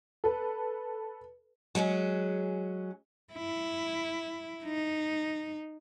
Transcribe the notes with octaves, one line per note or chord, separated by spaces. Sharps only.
A4 B4
F#3 G#3 C#4 G#4
E4
D#4